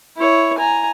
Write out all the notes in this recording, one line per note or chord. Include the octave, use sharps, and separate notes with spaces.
E4 C#5
G#5 A#5